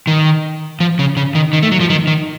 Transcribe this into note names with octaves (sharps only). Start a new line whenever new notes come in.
D#3
F3
C#3
C#3
D#3
D#3
A3
F#3
F3
D#3
D#3